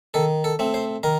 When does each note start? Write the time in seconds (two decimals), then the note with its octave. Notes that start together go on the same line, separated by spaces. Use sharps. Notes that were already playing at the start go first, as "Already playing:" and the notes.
0.14 D#3 A4
0.44 A4
0.59 A3 C4
0.74 C5
1.03 D#3 A#4